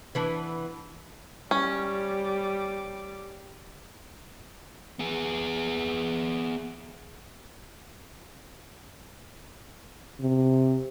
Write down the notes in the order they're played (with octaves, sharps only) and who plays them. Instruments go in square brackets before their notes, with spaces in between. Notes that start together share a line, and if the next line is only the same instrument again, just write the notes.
[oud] E3 B3 D4
[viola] G3 D6 [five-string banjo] C#4
[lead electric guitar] B3 G#4
[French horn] C3